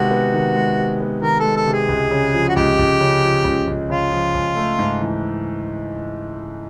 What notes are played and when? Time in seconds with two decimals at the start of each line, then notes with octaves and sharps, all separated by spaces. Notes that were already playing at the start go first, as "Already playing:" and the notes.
Already playing: C3 D#3 G#3 B3 F#4
0.11 B3
0.34 D#3
0.56 G#3
0.78 C3
1.00 B3
1.22 D#3 A#4
1.39 G#3 A4
1.56 A4
1.67 C3
1.73 G#4
1.89 C#2
2.11 C#3
2.34 F3
2.49 F#4
2.56 C#2 G4
2.79 C#2
3.00 C#3
3.23 F3
3.44 C#2
3.67 C#2
3.90 C#3 F4
4.12 F3
4.35 C#2
4.56 A3
4.79 G#2
5.01 E3